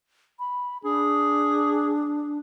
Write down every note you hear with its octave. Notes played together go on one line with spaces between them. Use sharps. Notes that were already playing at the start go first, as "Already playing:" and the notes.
B5
D4 G#4